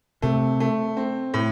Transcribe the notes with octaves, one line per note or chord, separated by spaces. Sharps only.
C3 A3
A3
C4
A2